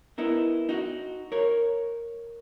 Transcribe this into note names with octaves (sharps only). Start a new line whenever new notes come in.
B3 D#4 E4 A#4
D#4 F#4
A#4 C#5